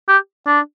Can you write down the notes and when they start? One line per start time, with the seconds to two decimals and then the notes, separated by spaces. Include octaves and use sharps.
0.08 G4
0.46 D4